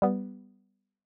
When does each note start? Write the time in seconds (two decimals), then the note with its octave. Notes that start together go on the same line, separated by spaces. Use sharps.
0.02 G3 B3